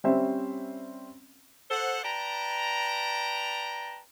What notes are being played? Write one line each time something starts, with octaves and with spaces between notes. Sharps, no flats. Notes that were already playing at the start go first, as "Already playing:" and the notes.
G3 C4 C#4 C5 E5
A4 C5 F#5
B4 D5 G5 A5 A#5